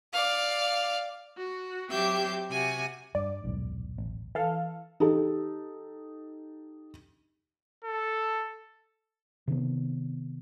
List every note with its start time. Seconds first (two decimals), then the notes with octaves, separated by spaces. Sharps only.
0.13 D5 F5
1.37 F#4
1.89 F#3 C4 G4 E5 G6
2.50 C3 F#4 G#5
3.15 G2 D5
3.44 D#1 B1 G#2
3.98 A1
4.35 E3 A4 F5
5.00 D#4 G4 A4
7.84 A4
9.47 C3 D#3 B3